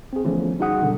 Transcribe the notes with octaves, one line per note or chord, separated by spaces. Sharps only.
C4 G#4
D3 E3 F3 A3 B3 C#4
G3 D#4 F#4 G#4 F#5 D#6
B2 D3 F#3 G3